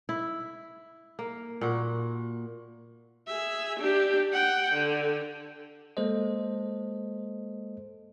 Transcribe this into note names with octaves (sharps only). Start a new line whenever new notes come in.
E4
A#3
A#2 F#4
G#4 E5
D4 G4
F#5 G5
D3
G#3 A#3 A4 C5 D#5